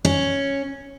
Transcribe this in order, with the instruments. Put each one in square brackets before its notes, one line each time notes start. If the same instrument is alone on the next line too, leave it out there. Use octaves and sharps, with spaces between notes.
[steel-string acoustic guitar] C#4